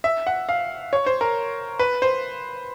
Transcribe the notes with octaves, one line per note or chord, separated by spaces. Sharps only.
E5
F#5
F5
C#5
C5
A#4
B4
C5